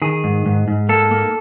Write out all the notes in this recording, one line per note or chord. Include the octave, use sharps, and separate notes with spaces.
D#3 G#4
G#2
G#2
G#2
A#3 A4
A#3